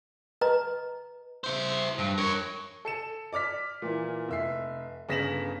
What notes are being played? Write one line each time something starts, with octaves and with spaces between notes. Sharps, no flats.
B4 D#5 A#5
E4 C5
G2
A#4 C#5
A4 C#7 E7
D5 D6 F6 B6
A#2 E3
F1 E5 C7
G1 C#3 A#6 B6 E7 F#7